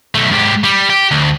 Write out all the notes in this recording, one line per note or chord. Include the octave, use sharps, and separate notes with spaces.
B1 A3
G#2 G4
G3
G4
D2